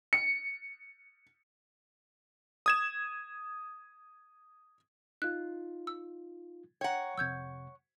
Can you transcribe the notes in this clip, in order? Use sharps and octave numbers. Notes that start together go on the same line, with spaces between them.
C#7
D#6 G#6 E7
D#4 F4 F#6
E6
C#5 F#5 G5 A#5
F2 C3 E6 G6 G#6